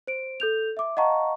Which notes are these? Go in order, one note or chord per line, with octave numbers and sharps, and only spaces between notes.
C5 D7
A4 G6 F7
E5 D6
D#5 F5 F#5 A5 A#5 C#6